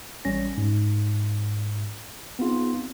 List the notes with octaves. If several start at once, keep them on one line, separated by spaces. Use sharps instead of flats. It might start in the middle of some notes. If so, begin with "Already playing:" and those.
A1 G3 C#4 A#6
G#2
B3 C4 D#4 F4 G#4